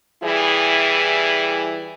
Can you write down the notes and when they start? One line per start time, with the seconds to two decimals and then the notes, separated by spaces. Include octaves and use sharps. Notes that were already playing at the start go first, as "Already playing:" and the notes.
0.23 E3 G3 E4 G#4